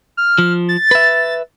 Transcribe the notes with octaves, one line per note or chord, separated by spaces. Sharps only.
F6
F3
A6
B4 E5